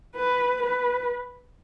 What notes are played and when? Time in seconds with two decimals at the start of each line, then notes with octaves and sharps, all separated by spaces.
0.15 B4
0.63 B4